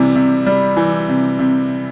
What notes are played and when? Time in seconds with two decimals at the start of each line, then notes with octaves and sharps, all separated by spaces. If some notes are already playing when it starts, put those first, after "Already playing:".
Already playing: C3 E3 G3
0.15 C3
0.47 G3
0.77 E3
1.09 C3
1.39 C3